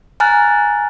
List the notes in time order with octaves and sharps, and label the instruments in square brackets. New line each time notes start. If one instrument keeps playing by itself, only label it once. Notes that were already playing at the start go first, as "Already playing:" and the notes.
[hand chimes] G#5 A#5 F6 F#6 A6